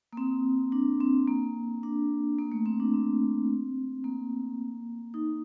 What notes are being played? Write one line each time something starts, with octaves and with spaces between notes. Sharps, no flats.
A#3
C4
D4
C4
A#3
D4
A#3
A3
C4
D4
C4
A#3
D#4